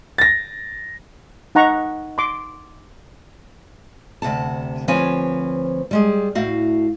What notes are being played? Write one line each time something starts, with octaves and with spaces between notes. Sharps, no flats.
A6 A#6
D#4 F#5 A#5 C#6
C6 D6
D2 C3 F#5 A5
D2 F3 C4 B4 C#5 G#5
G3 G#3 G#4
A2 A3 F#4 F5